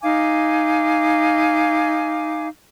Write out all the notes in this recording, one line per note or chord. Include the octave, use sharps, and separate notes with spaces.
D#4 F5 G#5 D6